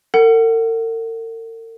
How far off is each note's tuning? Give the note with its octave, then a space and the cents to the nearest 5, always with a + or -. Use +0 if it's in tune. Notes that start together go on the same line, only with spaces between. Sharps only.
A#4 -45 F#5 +15